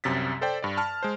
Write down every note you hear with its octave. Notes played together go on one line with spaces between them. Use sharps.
C2 F#2 C3 A6 B6
A4 C5 D5 G5
G2 D5
A5 F6
G#3 C5